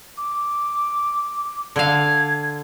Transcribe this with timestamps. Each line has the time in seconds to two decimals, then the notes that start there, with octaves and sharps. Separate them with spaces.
0.17 D6
1.76 D3 F5 G#6